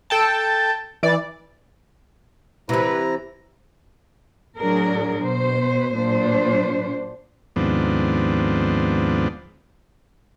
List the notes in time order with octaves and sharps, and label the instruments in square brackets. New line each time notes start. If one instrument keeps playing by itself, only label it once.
[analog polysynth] A4 G5 A5
E3 D5
[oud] C3 E3 [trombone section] G3 B4 [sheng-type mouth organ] E4 A#5
[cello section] A2 F#3 D4 G#4 A#4
B2 C5
A#2 F#3 D4 C5
[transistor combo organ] D#2 G#2 F3 B3 C4 D4